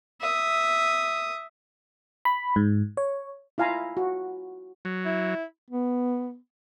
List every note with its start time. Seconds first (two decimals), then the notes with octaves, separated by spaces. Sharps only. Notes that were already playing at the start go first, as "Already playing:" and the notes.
0.21 E5 D#6
2.25 B5
2.56 G#2
2.97 C#5
3.58 E4 F4 F5 G#5 A#5 B5
3.97 F#4
4.85 F#3
5.05 E4
5.70 B3